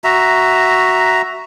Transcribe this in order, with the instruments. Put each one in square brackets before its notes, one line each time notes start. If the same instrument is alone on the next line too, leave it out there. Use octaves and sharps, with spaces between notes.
[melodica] F#4 E5 A#5